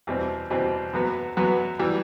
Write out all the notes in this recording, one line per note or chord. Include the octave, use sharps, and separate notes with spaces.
E2 B2 G3 C4
E2 B2 G3 C4
F#2 F#3 B3 F#4 B4
F#2 F#3 B3 F#4 B4
E3 G3